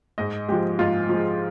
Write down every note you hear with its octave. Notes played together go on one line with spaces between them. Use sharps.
G#2 D#5
F3 G#3 G4
G#2 F4
F3 G#3